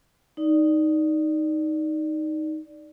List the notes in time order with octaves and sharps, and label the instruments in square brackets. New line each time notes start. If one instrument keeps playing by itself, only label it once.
[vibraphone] D#4 D5